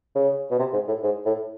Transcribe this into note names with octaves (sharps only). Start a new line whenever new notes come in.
C#3
B2
C3
G#2
A2
G#2
A2